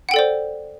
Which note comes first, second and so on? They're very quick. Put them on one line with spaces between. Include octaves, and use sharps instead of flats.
F#5 G5 A4 D5 C5